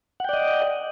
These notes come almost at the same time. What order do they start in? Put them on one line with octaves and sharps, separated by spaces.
F#5 G5 D5 D#5